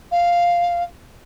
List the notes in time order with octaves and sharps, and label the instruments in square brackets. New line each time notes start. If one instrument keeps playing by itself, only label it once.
[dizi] F5